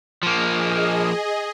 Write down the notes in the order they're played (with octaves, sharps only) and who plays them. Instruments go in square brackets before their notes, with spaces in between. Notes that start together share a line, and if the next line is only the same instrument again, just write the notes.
[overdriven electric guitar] F3 A#3 [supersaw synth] G#4 D#5